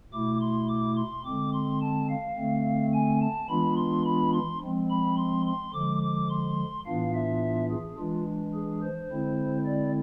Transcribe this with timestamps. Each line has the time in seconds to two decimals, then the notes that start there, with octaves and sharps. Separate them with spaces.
0.13 B2 A3 E4 D6
0.41 C6
0.69 D6
0.97 C6
1.25 D3 G#3 C4 D6
1.53 C6
1.82 A5
2.09 F5
2.37 D3 A3 C4
2.93 G#5
3.22 A5
3.49 E3 G#3 B3 D4 F4 B5
3.77 C6
4.05 B5
4.33 C6
4.62 F3 G#3 C4
4.90 B5
5.17 C6
5.46 C6
5.74 D3 F3 G#3 D6
6.02 D6
6.30 C6
6.86 A2 E3 B3 D4 F4 F5
7.14 E5
7.71 G#4
7.98 E3 G#3 D4 F4
8.54 G#4
8.83 C5
9.11 D3 G#3 C4 E4
9.66 D5